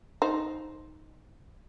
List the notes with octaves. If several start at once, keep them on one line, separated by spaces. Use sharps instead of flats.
D#4 C5